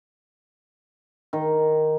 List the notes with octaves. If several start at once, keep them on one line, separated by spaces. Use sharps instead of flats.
D#3